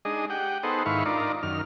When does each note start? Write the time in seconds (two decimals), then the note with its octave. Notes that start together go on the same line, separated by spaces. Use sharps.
0.05 G#3 D4 D#4 G#4 D#5
0.30 G4 F#5 G5
0.63 B3 D#4 G#4 A4 C5 F#5
0.86 G#2 D#3 E4 B4 F5 C#6
1.05 D4 D#4 F4 A#4 D5
1.43 F#2 D#3 F6